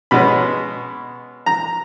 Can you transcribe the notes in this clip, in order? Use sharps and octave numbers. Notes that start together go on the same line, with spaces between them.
B2 G#3 C#4 B5
A#5